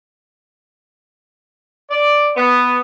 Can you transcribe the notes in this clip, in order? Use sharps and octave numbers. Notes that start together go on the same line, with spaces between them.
D5
B3